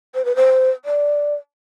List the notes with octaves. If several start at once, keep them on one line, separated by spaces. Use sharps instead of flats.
C5
B4
C5
D5